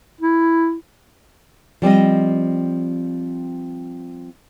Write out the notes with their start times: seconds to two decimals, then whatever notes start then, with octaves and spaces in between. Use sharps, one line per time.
0.21 E4
1.82 F3 G3 C4 D#5